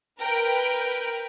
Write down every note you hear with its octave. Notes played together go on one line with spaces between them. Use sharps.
A#4 B4 G5